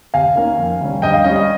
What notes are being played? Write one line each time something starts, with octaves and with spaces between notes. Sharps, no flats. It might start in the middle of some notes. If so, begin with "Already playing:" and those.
C3 F5 G#5
D#3 A#3 C#4
F2
C3 G3 C#4
G2 D#5 G5
F5
G3 C#4 D#5
D#5